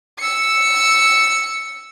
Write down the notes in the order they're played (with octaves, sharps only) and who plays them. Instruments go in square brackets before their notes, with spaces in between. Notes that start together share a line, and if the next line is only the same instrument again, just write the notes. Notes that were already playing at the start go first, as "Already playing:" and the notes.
[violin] E6 C#7